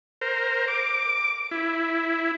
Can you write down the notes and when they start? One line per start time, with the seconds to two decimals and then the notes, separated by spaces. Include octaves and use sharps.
0.21 A#4 C5
0.68 D6
1.51 E4